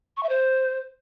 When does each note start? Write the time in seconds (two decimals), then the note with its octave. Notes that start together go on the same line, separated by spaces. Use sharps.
0.17 C#6
0.23 E5
0.29 C5